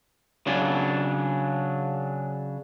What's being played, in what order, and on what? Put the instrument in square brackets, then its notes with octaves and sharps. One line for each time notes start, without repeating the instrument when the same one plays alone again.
[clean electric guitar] C#3 F#3 D4